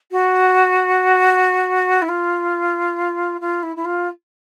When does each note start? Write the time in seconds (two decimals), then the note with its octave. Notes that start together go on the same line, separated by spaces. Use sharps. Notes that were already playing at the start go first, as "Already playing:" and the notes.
0.11 F#4
2.02 E4
2.08 F4
3.40 F4
3.62 E4
3.76 E4
3.84 F4